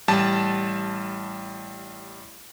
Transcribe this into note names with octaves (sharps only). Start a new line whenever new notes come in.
A1 G3 A5